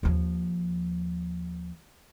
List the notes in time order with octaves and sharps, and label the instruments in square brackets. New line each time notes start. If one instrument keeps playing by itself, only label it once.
[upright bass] D#2 F3